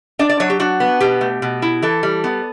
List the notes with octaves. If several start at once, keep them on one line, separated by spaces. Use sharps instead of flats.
D4 D5
D5
F#3 C#5
G4
D4 F#4
B3
B2 G4
A3
B2
E4
E3 A4
G3
B3